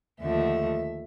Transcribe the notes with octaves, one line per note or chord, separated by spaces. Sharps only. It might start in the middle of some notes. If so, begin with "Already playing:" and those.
D#2 D3 F3 A3 E5